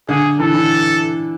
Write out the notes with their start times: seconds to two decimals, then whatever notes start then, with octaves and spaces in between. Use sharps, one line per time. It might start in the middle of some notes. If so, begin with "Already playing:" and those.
0.09 D3 G#4
0.39 E3 A4
0.54 E3